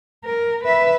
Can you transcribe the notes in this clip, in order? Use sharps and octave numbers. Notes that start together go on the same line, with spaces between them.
A#4
B4 E5